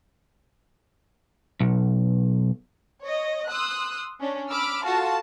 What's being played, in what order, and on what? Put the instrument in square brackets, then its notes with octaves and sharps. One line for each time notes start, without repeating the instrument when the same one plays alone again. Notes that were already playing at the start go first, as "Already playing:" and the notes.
[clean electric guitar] B1
[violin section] C#5 D#5
C6 D#6 E6 F#6
C#4 D4
B5 D6 E6 F6
F4 F#4 A4 F5 A5